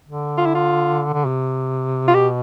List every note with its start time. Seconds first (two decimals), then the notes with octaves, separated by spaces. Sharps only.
0.08 D3
0.38 F4
0.46 E4
0.55 F4
1.14 D3
1.26 C3
2.08 F4
2.14 B2 G4